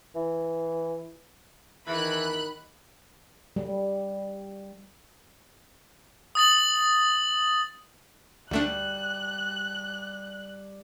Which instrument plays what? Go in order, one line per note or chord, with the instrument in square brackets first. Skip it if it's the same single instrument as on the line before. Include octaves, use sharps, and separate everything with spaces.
[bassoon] E3
[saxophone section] E2 E3 [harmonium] D#3 [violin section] B5 F#6
[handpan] G3
[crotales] D#6 A6 F#7
[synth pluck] D2 A3 D4 [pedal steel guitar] G3 [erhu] F#6